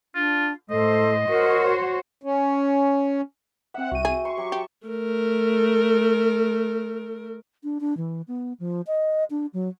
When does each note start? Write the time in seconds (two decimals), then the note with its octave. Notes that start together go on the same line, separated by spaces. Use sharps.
0.15 D4 F4
0.70 A2 A4 C5 D#5
1.29 F#4 A#4 C5 C#5
2.23 C#4
3.74 C4 E5 F#5 G5
3.91 C2 F#4 G5 D#7
4.05 G#4
4.25 C6 C#6
4.37 F#3 G4 G#5
4.52 G4 G5 A5
4.87 A3 A#4
7.63 D4
7.80 D4
7.97 E3
8.28 B3
8.60 F3
8.87 D#5
9.30 D4
9.53 F#3